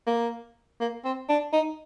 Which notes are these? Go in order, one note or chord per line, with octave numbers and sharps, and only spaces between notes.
A#3
A#3
C4
D4
D#4